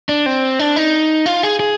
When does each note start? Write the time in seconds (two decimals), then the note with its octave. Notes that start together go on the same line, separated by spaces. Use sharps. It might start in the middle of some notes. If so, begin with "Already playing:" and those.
0.09 D4
0.26 C4
0.59 D4
0.76 D#4
1.26 F4
1.43 G#4
1.60 G#4